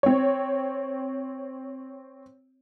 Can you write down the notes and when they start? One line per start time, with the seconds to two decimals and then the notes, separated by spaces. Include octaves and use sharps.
0.03 C4 C#5